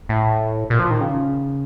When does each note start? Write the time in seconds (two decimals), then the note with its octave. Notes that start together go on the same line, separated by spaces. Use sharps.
0.09 A2
0.70 A#2
0.79 F3
0.90 D#3
1.01 C#3